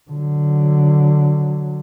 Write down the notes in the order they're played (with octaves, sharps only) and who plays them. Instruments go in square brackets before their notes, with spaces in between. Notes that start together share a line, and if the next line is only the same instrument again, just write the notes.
[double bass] D3 F#3